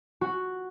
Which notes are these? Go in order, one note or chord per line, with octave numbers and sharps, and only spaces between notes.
F#4